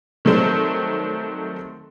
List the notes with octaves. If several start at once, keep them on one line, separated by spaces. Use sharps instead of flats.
D#3 F#3 G3 A3 C4